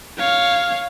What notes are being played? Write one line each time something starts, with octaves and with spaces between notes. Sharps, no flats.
C#5 F5